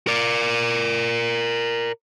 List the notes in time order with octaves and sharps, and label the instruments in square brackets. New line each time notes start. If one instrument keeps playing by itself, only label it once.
[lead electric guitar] A#4 D5